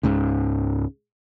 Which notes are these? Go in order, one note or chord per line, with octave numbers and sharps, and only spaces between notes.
C#2 G#2 C#3